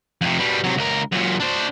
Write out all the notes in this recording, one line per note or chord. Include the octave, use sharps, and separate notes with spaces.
F2 C3
B2 G3
C3 F#3
C#2 A#4
F#2 A#2
D4 C5